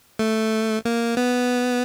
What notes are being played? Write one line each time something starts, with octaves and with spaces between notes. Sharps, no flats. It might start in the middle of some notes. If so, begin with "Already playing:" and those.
A3
A#3
B3